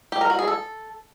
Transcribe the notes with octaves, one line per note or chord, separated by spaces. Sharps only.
G4
A#4
F#4
G#4
A4